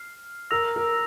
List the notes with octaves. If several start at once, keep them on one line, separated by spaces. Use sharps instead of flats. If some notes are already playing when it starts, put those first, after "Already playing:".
Already playing: F6 C7
A#4 E6 A#6 F7
A#4